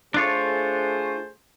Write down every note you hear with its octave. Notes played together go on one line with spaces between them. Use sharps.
A3 D4 F4 G#4 C5 C#5